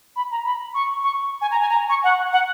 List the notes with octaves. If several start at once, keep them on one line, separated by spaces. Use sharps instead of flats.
B5
A#5
B5
C#6
C#6
G#5
A#5
G#5
A#5
C#6
F#5
F#5